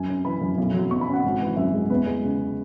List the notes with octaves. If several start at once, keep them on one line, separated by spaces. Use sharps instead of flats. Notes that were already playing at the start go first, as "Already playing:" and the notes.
Already playing: F#2 G#5
C#4
E3 B5
F#2
B1
F#3
B2 C#6
B5
C#4
F#5
G#1
E3
F#2 E5
G#3
E2 B4
G#3
C#3